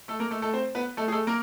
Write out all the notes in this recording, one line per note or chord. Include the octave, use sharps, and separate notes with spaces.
A3 A4
A#3 A#4
A3 A4
A3 A4
C4 C5
B3 B4
A3 A4
G#4
A3 A4
A#3 A#4